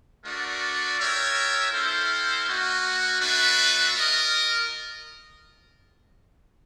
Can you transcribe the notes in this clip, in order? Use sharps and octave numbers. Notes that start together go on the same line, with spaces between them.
A3 D4 F#4 A#4 D5
F4 A#4 C#5 E5 G5
C4 E4 A4 C5 F5
A#3 D#4 F#4
A3 D4 F#4 B4 E5
F4 A#4 D#5